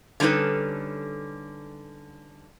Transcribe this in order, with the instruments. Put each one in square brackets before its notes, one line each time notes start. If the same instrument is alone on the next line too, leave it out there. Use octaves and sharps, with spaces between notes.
[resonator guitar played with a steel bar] D3 G3 C#4 D#4 A4 B4